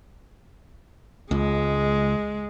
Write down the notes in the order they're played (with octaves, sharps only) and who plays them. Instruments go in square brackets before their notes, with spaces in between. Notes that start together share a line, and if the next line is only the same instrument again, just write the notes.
[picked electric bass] C#2 [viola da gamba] G#3